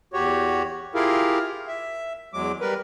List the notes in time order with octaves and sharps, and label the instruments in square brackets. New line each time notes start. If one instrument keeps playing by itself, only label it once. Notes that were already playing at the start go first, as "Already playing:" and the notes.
[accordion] E2 F#4 G4 C#5
E4 F4 G4 G#4 A#4 F5
E5
E2 F#3 G#3 D6
G3 A#4 B4